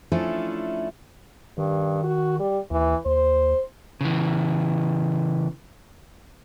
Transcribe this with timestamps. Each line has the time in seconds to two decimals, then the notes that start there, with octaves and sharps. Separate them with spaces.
0.12 F3 A3 C#4 D4 E4
1.58 G2 D#3
2.03 F#4
2.39 G3
2.71 D#2 E3
3.05 D#2 C5
4.01 C#3 E3